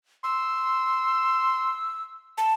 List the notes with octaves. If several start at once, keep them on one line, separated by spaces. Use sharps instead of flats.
C6 E6
A5